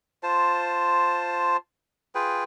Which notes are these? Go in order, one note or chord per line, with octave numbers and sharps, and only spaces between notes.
F4 C5 A5
F4 G#4 B4 G5